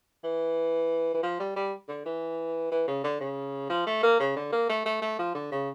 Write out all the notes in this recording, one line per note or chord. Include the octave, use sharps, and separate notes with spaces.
E3
E3
F3
G3
G3
D3
E3
E3
C#3
D3
C#3
F3
A3
A#3
C#3
D3
A#3
A3
A3
A3
F3
D3
C#3